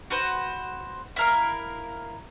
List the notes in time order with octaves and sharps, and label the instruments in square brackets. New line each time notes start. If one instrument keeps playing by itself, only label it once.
[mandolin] F#4 B4 C5
E4 A#4 F5